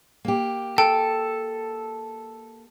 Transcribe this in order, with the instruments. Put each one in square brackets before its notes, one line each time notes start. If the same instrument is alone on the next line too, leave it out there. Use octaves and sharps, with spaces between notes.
[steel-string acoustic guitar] A#3 G4
[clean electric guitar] A4 [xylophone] G5